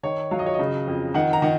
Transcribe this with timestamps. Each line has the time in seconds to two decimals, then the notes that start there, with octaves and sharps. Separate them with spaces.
0.03 D#3 C#5
0.31 F#3 F5
0.39 D#5
0.46 C#5
0.54 D#5
0.59 C#3
0.87 F2
1.14 D#3 F#5
1.33 A#5
1.42 D#3